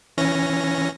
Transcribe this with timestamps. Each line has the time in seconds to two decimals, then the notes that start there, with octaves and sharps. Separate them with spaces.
0.18 E3 C#4 A#6